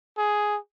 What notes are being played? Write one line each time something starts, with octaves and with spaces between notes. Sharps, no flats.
G#4